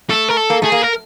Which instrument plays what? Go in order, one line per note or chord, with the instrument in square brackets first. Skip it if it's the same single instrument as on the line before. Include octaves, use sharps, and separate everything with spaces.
[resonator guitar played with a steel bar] A3 [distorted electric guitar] A4
[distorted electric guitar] A#4
A4
[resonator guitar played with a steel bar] A#3
[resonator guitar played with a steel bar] A3 [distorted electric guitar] G#4
[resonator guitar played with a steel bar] A#3
[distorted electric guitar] A#4